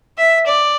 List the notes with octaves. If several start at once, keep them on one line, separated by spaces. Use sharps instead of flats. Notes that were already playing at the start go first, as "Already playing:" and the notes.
E5
D5